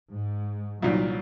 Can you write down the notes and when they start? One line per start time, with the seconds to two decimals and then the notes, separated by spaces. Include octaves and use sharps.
0.13 G#2
0.82 C2 A#2 D#3 F#3